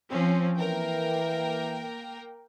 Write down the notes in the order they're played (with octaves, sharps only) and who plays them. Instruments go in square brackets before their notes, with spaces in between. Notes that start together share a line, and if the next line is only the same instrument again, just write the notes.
[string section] F3 C4 C#4
[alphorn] E3 [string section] A#3 A#4 G5